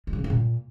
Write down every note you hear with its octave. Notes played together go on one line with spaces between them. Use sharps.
G#3
C#3
G3
C#3
A#2